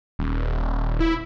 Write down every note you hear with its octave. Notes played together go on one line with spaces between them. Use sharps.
D#1
E4